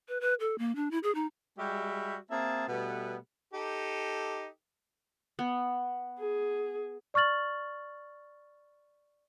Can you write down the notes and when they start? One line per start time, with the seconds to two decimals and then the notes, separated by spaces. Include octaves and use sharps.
0.08 B4
0.21 B4
0.40 A4
0.58 A#3
0.76 D4
0.91 E4
1.03 G#4
1.15 D#4
1.57 G3 G#3 F#4 G4 E5
2.30 A#3 C4 G#4 E5 A5
2.68 B2 G3 A3 B3
3.54 D#4 G4 A4
5.39 B3
6.20 G#4
7.14 D5 C#6 F6 A6 F#7